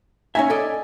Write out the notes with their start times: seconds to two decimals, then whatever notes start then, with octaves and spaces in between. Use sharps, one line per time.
0.35 C#4 D#4 E5 G#5
0.50 A4 D5 D#5